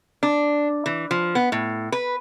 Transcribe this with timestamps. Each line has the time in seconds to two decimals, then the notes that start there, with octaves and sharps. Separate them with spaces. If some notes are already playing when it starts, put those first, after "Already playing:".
0.23 D4
0.86 E3
1.11 F3
1.35 B3
1.52 A2
1.92 B4